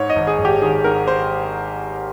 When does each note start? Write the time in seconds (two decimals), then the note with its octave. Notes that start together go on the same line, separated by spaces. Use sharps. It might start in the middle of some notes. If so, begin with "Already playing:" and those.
Already playing: G#2 C#5
0.10 D#5
0.16 G#1
0.27 G#4
0.39 G#1
0.45 G4
0.62 D#3 G#4
0.84 G#2 A#4
1.08 C5